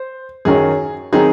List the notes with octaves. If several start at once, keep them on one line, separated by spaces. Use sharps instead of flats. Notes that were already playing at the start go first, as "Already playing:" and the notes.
Already playing: C5
F#2 D#3 F#3 C#4 G#4
D#3 F#3 C4 D#4 G#4